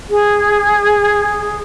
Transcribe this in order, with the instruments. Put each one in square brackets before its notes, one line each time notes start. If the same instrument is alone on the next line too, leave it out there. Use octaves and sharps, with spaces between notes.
[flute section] G#4